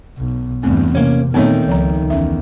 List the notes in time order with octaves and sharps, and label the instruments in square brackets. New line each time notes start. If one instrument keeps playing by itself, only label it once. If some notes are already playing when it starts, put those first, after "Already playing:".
[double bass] B1
[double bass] E2 G2 [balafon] A3 C4
[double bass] C3 [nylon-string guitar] A#3 C#4
[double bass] A#2 [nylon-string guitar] D#3 A3 D#4 [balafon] B3 C4 C#5
[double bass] C#2 [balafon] F3 A#5
[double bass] E2 [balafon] C#4 E5